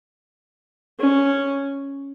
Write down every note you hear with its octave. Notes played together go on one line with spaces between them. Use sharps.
C#4